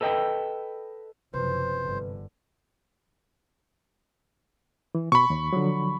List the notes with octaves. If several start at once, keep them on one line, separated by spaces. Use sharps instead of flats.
A4 B4 D#5 G5
F#1 C3 F3 B4 C5
G1 D3
E3
B2 B5 C#6
D#2
D3 F3 F#3